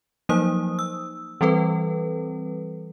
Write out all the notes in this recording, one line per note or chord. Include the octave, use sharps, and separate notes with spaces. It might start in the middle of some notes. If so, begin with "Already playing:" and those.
F3 F#3 A#3 D#4 C5 D#6
E6
E3 G3 C4 A4 B4